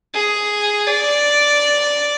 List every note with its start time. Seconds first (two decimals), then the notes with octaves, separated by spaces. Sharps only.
0.14 G#4
0.86 D5